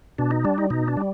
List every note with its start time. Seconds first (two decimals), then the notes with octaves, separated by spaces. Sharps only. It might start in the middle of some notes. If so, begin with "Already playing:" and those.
0.18 B2 D4
0.31 D#4
0.45 G3 D4
0.58 D#4
0.70 B2 D#4
0.88 D4
0.97 G3